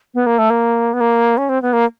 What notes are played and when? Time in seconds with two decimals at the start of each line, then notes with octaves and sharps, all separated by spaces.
0.14 B3
0.26 A#3
0.38 A3
0.50 A#3
0.94 B3
1.01 A#3
1.38 C#4
1.49 C4
1.62 B3
1.73 A#3